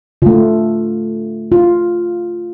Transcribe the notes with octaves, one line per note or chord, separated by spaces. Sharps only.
D3 A3 F4
F4